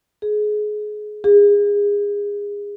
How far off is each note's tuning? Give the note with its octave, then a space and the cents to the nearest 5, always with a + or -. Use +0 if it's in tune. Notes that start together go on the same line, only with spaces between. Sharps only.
G#4 +25
G#4 -25